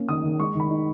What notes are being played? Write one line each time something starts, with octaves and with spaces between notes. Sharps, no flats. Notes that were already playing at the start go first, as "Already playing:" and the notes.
Already playing: A#3 C#4
D#3 D#6
D#3
G#3 C#6
D#3 B5
D#4